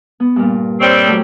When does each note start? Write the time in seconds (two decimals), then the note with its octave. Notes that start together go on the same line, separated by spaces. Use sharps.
0.20 B3
0.36 G2 A#2
0.80 G3 C4 C#5 D5 C6
1.08 F#3 A3